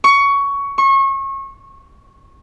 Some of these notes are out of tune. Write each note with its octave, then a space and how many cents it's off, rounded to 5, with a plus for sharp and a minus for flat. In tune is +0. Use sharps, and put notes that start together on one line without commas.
C#6 +15
C#6 -30